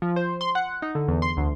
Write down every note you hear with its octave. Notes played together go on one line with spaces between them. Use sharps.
F3
C5
C6
F#5
D#4
D3
E2
C6
D2